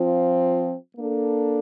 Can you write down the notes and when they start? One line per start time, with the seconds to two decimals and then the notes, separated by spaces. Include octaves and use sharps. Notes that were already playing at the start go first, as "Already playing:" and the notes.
Already playing: F3 C4 F4
0.96 A#3 D4 A4